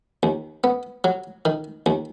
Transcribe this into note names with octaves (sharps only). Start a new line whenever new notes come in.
D#2
B3
F#3
D#3
D#2